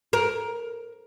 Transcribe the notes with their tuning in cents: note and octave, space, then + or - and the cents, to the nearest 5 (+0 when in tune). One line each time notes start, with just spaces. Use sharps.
A#4 +10